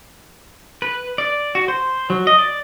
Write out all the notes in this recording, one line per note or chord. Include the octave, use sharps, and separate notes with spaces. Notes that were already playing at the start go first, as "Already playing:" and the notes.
B4
D5
F#4
C5
F#3
D#5
D5